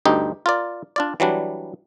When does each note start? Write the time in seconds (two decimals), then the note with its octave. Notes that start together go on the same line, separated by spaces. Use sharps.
0.06 D2 G2 D#4 G4
0.46 F4 A#4 D5
0.96 D4 F4 D5
1.20 E3 F#3 G3 D4